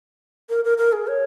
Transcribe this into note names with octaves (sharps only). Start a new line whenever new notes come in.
A#4
A#4
A#4
G#4
C#5